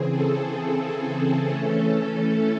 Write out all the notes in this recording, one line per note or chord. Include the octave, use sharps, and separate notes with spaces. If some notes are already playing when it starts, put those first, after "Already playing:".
Already playing: C#3 E3 C4 G#4
A4
E3 A3 C#4